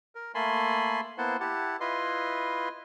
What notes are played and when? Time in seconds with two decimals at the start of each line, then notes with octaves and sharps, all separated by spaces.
0.15 A#4
0.35 A3 A#3 G#5 A5 B5 C6
1.18 A#3 B3 E4 C5 F#5 A5
1.40 E4 G4 F#5 A5
1.81 E4 F4 B4 D#5 C6